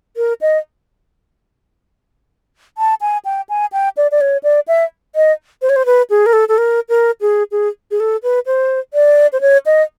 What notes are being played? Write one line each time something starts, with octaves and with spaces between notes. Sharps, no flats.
A#4
D#5
A5
G#5
G5
G#5
G5
D5
D5
C#5
D5
E5
D#5
C5
C#5
C5
B4
G#4
A#4
A4
A4
A#4
A#4
G#4
G#4
G#4
A4
B4
C5
D5
C5
C#5
D#5